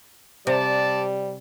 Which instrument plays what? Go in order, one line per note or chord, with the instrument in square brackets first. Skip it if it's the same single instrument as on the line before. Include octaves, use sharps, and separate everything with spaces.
[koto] C3 [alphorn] G3 [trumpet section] D5 A5